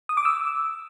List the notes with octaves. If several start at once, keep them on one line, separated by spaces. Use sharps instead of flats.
D#6
D6
E6